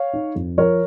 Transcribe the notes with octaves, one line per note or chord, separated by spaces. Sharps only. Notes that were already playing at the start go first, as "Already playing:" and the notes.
Already playing: C#5 F5
D#4
F2
F3 A#4 C#5